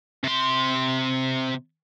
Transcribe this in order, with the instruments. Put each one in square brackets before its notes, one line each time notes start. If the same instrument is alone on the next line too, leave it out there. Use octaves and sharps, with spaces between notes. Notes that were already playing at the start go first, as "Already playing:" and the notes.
[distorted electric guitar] C3 C6